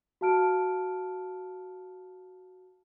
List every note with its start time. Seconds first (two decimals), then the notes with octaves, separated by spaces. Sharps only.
0.21 F#4 F5 A5 F6 D7